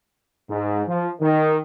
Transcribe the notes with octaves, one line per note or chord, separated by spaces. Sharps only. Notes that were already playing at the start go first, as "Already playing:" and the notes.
G#2
F3
D#3